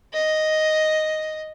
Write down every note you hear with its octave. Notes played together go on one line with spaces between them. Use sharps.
D#5